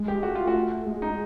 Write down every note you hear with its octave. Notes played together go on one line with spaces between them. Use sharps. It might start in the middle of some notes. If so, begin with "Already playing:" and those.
Already playing: G#3
G4
A3 F#4
F4
F#4
G#3
D#4